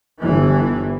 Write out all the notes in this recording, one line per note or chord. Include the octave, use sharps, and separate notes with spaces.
G1 E3